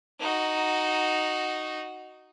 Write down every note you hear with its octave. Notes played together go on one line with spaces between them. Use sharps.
D#4 F#4